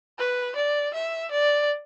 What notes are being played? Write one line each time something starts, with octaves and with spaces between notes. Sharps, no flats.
B4
D5
E5
D5